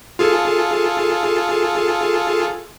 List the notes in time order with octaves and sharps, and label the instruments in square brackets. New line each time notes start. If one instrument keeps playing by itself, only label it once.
[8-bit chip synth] F4 G#4 A4